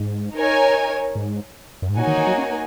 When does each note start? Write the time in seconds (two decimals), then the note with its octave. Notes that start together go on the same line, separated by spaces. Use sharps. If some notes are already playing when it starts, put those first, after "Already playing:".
Already playing: G#2
0.34 D#4 A#4 C#5 G#5
1.15 G#2
1.82 F#2
1.90 G#2
1.96 A#2 A#3 D#4 F#4 C#5 G#5
2.07 D#3
2.18 D#3
2.27 F#3
2.38 C#4